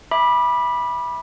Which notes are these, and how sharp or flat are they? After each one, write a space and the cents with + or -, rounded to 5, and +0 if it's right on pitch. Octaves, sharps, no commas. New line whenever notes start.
E5 +0 B5 -20 D6 +20